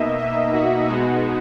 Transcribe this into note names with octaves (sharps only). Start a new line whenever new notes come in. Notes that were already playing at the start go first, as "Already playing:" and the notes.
Already playing: B2 A#3 D#4 D#5 E5
E5
F#4
B2 G#3 B3 D#4 F#4